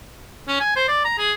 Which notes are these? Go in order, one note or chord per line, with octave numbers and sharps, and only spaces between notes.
C#4
G#5
C5
D5
A#5
G#4